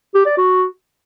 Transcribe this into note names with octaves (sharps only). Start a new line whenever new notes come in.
G4
D5
F#4